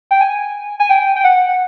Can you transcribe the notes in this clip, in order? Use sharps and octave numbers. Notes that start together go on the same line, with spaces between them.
G5
G#5
G#5
G5
G5
F#5